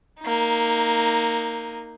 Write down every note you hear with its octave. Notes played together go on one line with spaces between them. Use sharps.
A#3 D#4